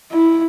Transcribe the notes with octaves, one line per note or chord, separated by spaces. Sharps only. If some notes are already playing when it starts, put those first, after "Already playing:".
E4